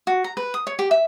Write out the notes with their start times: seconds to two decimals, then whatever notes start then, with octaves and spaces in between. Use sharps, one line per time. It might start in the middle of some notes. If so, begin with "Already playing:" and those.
0.07 F#4
0.24 A#5
0.37 B4
0.54 D#6
0.67 C#5
0.79 G4
0.91 E5